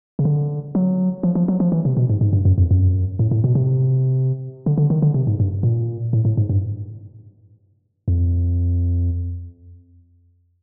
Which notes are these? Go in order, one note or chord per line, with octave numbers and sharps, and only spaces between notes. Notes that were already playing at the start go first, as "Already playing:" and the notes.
C#3
D3
F#3
F3
F3
F#3
F3
E3
C3
B2
G#2
G#2
G2
F#2
F2
F#2
A2
A2
B2
C3
D3
D3
D#3
D3
C3
G#2
G2
A#2
A2
A2
G#2
G2
F2